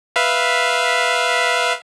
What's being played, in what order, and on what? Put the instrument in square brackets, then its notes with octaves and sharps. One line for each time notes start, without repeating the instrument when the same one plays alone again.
[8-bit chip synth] B4 E5 F5